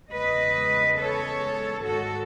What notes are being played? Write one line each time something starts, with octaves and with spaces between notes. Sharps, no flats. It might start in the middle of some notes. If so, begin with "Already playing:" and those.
E2 C#3 G#3 B4 D#5
A4 C#5
G#2 D#3 G#3 F#4 A4